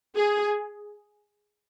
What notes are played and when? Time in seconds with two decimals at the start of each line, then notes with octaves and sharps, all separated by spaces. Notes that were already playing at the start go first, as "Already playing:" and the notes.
0.16 G#4